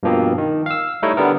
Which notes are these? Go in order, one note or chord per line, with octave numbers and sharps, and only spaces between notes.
G2 B2 F3 A#3 C4
D#3
F5 E6
G3 A3 D#4 E4 C#5 D#5
D3 G3 B3 A#4